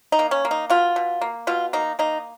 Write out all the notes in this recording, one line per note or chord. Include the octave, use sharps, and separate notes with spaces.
D#4
A#3
C#4
A#3
D#4
B2 F4
B2
A#3
B2 F4
A#3 D#4
A#3 D#4